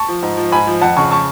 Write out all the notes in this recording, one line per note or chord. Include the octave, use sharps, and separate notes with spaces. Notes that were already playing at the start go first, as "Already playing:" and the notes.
Already playing: A5 C#6
F3
G#2
F3
G#2 G#5 B5
F3
F2 F#5 A5
C#3 A5 C#6
A5 C#6